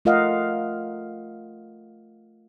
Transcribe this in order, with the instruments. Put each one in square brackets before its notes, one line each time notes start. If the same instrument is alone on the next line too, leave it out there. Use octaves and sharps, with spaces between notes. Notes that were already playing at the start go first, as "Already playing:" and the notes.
[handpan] A3 F4 A#4 D#5 F5 F#5